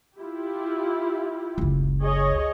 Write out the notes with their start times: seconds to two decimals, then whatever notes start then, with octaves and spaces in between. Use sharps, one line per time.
0.19 E4 F4 G4
1.58 F#1 C#2
2.03 G#4 C#5 D#5